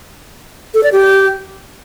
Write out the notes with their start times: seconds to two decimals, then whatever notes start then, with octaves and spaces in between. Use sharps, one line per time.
0.74 A4
0.83 D5
0.92 G4